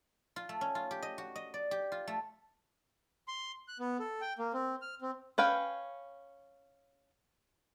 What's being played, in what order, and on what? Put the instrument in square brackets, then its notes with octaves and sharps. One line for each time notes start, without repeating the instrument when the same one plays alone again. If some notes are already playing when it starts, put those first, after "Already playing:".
[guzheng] F4
A3
C#4
F4
G4
D#5
F#4
D#5
D5
G4
F4
A3
[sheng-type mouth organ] C6
F#6
B3
A4
G5
A#3
C4
F6
C4
[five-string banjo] C#4 B4 F5 G5